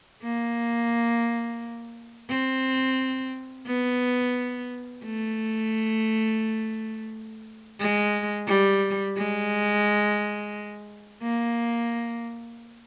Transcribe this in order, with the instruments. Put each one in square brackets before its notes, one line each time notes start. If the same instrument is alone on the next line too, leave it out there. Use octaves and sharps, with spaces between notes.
[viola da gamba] A#3
C4
B3
A3
G#3
G3
G#3
A#3